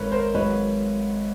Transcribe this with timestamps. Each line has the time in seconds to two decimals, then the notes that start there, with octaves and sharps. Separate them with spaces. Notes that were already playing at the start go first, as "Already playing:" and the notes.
Already playing: G#1 G#2 D#3 A#4 B4 C#5
0.12 A#4 C5
0.34 G#1 G#2 D#3 F#3 B4 C#5